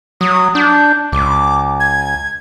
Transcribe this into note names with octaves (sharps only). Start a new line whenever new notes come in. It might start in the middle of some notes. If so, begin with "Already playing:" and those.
F#3 D#6
D4 G6
C#2 D6
G#6